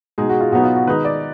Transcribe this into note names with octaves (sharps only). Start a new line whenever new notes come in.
B2 G#3 D#4 G#4
F#4
F4
B2 F#3 B3 D#4 F#4
F4
F#4
D#3 G#3 D#4 B4
D5